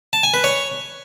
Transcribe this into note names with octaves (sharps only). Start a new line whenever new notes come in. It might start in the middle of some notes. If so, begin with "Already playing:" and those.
A5
G#5
B4
C#5